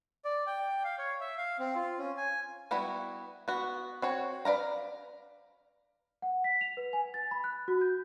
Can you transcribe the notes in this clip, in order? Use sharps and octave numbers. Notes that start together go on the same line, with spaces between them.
D5
G5
F5
C#5
E5
F5
C4
F4
C#4
G#5
G3 B3 E4 F#4
B3 F#4
C4 F#4 C#5
B4 D5 F5 A#5
F#5
B6
F7
B4
G#5
A6
B5
F#6
F#4
G6